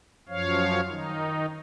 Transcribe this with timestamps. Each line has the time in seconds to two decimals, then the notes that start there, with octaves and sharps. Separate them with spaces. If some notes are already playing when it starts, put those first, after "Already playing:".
0.29 F#2 F3 C#5 F5
0.88 D#3 D#4